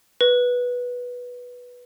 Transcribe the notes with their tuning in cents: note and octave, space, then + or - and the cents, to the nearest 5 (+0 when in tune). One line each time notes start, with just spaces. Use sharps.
B4 -10